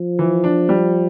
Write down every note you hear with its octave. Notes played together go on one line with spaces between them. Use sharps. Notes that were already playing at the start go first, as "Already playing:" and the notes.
Already playing: F3
E3
D4
G3